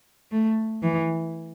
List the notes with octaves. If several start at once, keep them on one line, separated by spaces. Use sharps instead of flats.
A3
E3